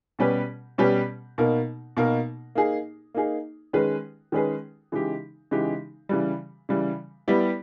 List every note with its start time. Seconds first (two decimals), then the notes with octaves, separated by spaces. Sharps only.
0.19 B2 G3 C#4 G4 B4
0.78 B2 G3 C#4 G4 B4
1.38 B2 A#3 D#4 A#4
1.97 B2 A#3 D#4 A#4
2.55 A#3 D#4 G#4
3.14 A#3 D#4 G#4
3.73 D#3 G#3 C#4 G#4 B4
4.32 D#3 G#3 C#4 G#4 B4
4.92 C#3 E3 G#3 D#4 G4
5.51 C#3 E3 G#3 D#4 G4
6.09 C#3 E3 G3
6.69 C#3 E3 G3
7.28 G3 B3 E4 G4